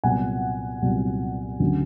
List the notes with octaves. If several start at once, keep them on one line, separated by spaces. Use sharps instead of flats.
C2 A#2 F#3 B3 F#5 G#5
C2 A#2 F#3 B3
D2 C#3 F#3